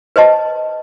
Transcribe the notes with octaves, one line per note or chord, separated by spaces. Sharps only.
B4 C5 D#5 A5